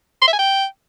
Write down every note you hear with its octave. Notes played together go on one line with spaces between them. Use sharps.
C6
E5
G#5
G5